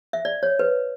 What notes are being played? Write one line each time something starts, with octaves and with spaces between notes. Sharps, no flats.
E5
D5
C#5
B4